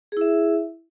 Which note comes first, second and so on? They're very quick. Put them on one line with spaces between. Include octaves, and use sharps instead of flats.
G#4 E4 E5